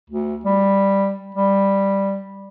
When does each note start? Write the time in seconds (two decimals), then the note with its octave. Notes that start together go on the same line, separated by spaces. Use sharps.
0.10 D2
0.45 G3
1.35 G3